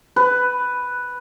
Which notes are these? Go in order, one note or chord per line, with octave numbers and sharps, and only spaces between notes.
B4